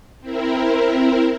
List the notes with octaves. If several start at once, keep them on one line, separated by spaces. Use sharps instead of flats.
C4 E4 A#4